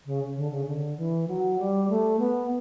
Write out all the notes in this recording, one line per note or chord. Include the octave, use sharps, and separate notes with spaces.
C#3
D3
C#3
D3
E3
F#3
G3
A3
B3